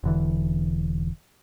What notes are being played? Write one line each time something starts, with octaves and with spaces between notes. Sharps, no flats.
E1 D3 E3